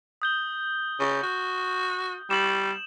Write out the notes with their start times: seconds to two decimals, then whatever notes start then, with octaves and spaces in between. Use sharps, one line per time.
0.22 D#6 G6 G7
1.00 C#3
1.23 F#4
2.30 G3 E7 F#7